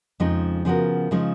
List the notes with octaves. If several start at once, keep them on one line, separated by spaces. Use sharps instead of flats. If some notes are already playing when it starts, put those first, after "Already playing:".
F2 C#3 F3 G#3 D#4
C#3 F3 B3 F#4 A#4
C#3 F3 G#3 D#4